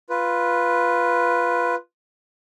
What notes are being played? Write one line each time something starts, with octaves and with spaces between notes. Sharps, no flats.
F4 B4